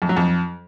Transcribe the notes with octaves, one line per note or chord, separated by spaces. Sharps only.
F2
F#3
F2